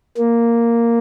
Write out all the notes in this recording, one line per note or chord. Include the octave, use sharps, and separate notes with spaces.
A#3